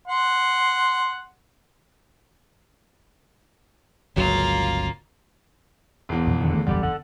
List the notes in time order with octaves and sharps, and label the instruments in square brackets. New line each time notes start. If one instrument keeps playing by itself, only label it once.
[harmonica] F#5 C6
[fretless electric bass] G1 C#2 F#3 [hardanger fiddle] A#3 F4
[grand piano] E1 E2
[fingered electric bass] F2 B2 F3
[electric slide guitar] D3 D#3
[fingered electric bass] A3
[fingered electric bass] F#1 B1 E2 [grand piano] D3 [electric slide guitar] G3 G4 D5
[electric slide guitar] A4 F#5